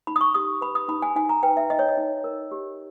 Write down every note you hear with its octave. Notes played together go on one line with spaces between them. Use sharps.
D#4 B5
D#6
C#6
G4 D#6
B4 B5
D#6
D#4 B5
G#5
D#4 G#5
A#5
B4 G5
E5
D#4 D#5
C#5
D#5
D#4
A#4
G4